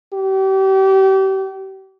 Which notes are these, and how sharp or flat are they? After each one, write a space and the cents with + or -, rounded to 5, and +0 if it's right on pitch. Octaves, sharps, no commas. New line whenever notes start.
G4 -35